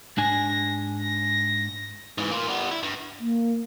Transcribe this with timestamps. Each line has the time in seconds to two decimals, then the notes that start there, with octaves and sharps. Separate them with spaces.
0.18 G#2 D4 G#5 A#6
1.00 A#6
2.18 G#2 E3
2.31 A#3 F4
2.48 G3 B3
2.71 E4
2.83 G2
3.20 A#3